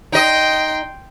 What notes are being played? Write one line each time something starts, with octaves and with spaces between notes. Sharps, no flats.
D#4 D#5 G5 C6